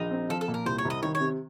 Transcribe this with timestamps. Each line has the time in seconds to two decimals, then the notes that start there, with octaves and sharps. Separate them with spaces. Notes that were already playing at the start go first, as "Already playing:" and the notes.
Already playing: A#1 D#4
0.11 C4
0.29 F3 A4
0.41 A4
0.48 A#2
0.54 A#4
0.65 C2 C5
0.78 C#5
0.85 C2
0.90 D#5
1.02 D#3 C#5
1.15 C#5
1.20 C3